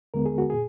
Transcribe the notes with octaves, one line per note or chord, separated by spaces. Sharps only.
D#2 D3 G#3 B3 A#4
G#4
F#4
A#2 G#4